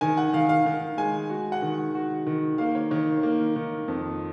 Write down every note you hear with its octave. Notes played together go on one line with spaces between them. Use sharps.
D#3 G#5
F#5
D#3 F5
F5
D#3
G#3 G#5
F#4
F#5
D#3
F#4
D#3
A#3 F5
C#5
D#3 C#5
A#3
D#3
F2